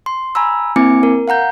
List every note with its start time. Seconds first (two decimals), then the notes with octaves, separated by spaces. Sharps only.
0.06 C6
0.35 G#5 A#5 B5 E6
0.76 A#3 C4 E4 G#5 D6 C#7
1.03 A#4
1.28 F5 F#5 A#5 G6